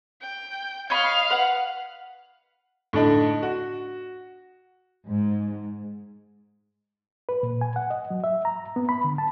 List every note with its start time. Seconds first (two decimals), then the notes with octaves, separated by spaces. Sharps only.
0.21 G5
0.90 C#5 D#5 F5 B5 F6
1.30 B4 F#5
2.93 A2 D3 D4 D#4
3.43 F#4
5.06 G#2
7.29 B4
7.43 A#2
7.61 G#5
7.76 F#5
7.90 D#5
8.11 F#3
8.24 E5
8.45 A#5
8.76 B3
8.89 B5
9.04 D3
9.18 A5